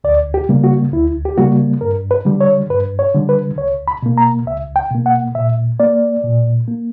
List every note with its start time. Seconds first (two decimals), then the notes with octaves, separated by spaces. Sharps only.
0.04 D2 D5
0.34 G4
0.49 C#3 G3 A#3
0.64 F#4
0.93 D2 E4
1.25 G4
1.37 C#3 G3 A#3 F#4
1.81 G2 A#4
2.11 B4
2.25 D3 G3
2.41 C#5
2.70 G2 B4
2.99 C#5
3.14 D3 G3
3.29 B4
3.58 C#2 C#5
3.88 B5
4.03 B2 A#3
4.18 A#5
4.46 C#2 E5
4.76 G5
4.91 B2 A#3
5.06 F#5
5.35 A#2 E5
5.80 A#3 D5
6.24 A#2
6.68 A#3